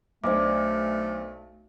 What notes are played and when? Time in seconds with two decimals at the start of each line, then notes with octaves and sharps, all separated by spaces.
0.24 B1 A3 D4 C5 D5 D6